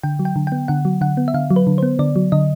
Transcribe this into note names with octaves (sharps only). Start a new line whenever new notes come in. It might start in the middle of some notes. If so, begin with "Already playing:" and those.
D3 G5
F#3
G5
D3
B3 G5
D3 F#5
F#3
D3 F#5
B3
E5
D3 F5
F#3
B4
D3
B3 C5
D3 D5
F#3
D3 D#5